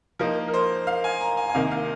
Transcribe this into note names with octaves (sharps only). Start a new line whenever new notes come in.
F3 A#3 D#4 A#4
A#4
C5
F5
G#5
A#5
G#5
G#5
C3 D#3 A#3 F5
F5